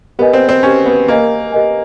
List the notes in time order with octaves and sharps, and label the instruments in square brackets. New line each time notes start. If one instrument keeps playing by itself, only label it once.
[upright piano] B3 [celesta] G4 A#4 D#5 G#5
[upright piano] C4
C4
[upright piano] C#4 [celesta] G4 A#4 D#5 G#5
[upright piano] B3
[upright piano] A#3 [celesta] G4 A#4 D#5 G#5
[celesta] G4 A#4 D#5 G#5